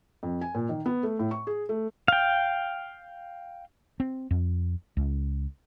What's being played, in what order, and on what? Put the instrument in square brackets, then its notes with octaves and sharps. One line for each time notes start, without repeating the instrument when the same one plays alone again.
[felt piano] F2
G#5
A#2
D#3
B3
A3
A2
C#6
G#4
A3
[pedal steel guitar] F5 G5
[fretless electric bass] C4
F2
C#2